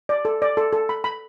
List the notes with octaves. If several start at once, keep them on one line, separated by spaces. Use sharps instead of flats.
D5
A4
D5
A4
A4
B5
B5